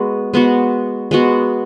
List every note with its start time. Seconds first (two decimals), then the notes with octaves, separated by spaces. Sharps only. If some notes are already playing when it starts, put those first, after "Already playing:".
Already playing: G#3 B3 F#4
0.33 G#3 B3 F#4
1.11 G#3 B3 F#4